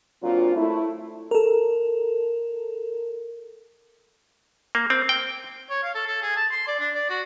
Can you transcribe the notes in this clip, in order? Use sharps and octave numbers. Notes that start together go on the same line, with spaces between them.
A#2 F#3 C4 D4 F4
A3 E4
A4 A#4
A#3
C4
G5
C#5
F5
A4
A4
G#4
A5
C6
D5
D4
D5
F#4